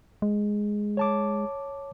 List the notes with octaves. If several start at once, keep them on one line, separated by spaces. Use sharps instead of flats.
G#3
C#5 A5 D6